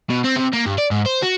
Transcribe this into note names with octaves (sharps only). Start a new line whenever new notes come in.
B2
C4
C3
A#3
G2
D5
G#2
C5
F#4